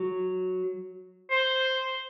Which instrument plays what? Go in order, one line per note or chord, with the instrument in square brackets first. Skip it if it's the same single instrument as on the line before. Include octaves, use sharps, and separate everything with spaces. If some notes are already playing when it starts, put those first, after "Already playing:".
Already playing: [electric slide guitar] F#3
[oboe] C5